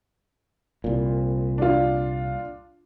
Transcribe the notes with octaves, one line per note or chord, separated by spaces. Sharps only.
C2 A#2
D4 F4